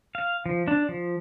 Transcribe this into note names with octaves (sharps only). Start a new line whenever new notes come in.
F5
F3
D4
F3